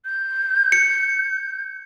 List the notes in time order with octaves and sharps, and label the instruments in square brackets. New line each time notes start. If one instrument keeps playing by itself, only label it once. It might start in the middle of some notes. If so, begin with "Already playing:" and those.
[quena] G6
[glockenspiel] C#7